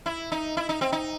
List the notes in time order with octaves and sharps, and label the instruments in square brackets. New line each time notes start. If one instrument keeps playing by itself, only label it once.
[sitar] E4
D#4
E4
D#4
C4
D#4